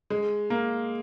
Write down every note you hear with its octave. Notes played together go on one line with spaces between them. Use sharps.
G#3
A#3